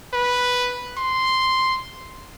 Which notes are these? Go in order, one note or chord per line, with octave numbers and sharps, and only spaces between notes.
B4
C6